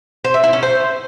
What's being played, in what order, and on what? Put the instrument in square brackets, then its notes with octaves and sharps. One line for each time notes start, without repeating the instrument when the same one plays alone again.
[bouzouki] C5
E5
E4
C#4
C5